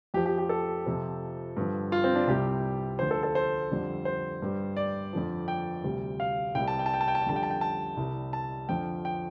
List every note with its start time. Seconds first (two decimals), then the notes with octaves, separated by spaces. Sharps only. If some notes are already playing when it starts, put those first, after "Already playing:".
0.14 F2 F3 G4
0.26 G4
0.38 G4
0.49 A4
0.86 F2 C3 F3
1.57 G2 D3 F3
1.92 F4
2.04 C4
2.15 D4
2.27 C2 C3 G3 G4
2.99 D2 D3 F3 C5
3.11 A4
3.23 A4
3.35 C5
3.71 F2 D3 G3
4.05 C5
4.42 G2 G3
4.77 D5
5.13 F2 D3 F3
5.48 G5
5.84 D2 C3 G3
6.20 F5
6.55 C2 C3 G3 G5
6.68 A5
6.79 G5
6.86 A5
6.94 G5
7.01 A5
7.08 G5
7.15 A5
7.22 G5
7.26 F2 D3 G3 A5
7.36 G5
7.43 A5
7.50 G5
7.61 A5
7.97 C2 C3 G3
8.33 A5
8.69 F2 D3 F3 G5
9.05 G5